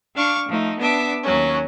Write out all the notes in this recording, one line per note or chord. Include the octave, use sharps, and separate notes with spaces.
D4 F5 C#6 D6
F3 A3 D#4
B3 D4 E5 A5 D6
D#2 F#3 C#4